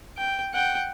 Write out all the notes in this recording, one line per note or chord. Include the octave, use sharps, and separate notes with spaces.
G5
F#5 G5